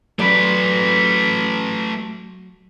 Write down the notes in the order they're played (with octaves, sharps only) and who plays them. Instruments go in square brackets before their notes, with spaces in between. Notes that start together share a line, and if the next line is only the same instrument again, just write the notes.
[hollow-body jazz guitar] F#3 D5 [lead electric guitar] A3 B4